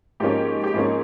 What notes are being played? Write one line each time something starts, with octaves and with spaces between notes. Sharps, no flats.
G#2 F3 A#3 C#4 G4
G4
G#2 F3 A#3 C#4 G#4